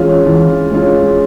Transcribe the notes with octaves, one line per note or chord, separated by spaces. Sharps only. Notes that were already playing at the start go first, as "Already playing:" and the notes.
Already playing: E3 G#3 C#4 F4
E3
G#3 C#4 F4